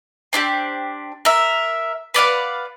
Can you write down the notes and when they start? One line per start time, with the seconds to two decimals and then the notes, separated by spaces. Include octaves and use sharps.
0.33 C4 D4 E4 G4
1.25 A#4 E5
2.14 B4 D5 F5 F#5